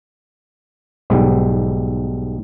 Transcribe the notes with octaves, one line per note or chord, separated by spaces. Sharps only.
B1 G#2 G3